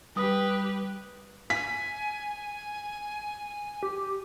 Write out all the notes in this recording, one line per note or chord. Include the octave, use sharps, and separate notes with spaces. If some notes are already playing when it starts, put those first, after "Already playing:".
G3 G4 B4 D#6
G#5 B6
G4